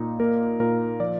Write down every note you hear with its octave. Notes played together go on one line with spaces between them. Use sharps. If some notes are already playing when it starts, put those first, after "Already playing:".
Already playing: A#2 D#4
A#3 A#4
A#2 A#4
F3 D5